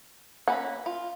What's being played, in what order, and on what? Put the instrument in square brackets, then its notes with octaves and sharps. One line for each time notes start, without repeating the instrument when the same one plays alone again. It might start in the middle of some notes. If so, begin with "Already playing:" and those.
[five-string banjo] A#3 C#4 B4 [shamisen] F#5
[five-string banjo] F4